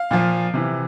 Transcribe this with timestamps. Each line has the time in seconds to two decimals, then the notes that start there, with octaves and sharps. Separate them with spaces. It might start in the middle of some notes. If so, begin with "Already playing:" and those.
Already playing: F5
0.11 A#2 F3
0.54 C3 E3